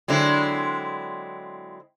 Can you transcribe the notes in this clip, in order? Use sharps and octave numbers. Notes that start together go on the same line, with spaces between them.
D3 F#3 G#3 C4 E4